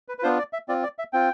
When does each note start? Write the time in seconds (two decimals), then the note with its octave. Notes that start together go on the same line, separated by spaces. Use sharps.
0.08 B4
0.19 B4
0.23 B3 D4 F4 C5
0.38 D5
0.53 E5
0.68 C4 F4 D5
0.83 D5
0.99 E5
1.13 C4 F4 G5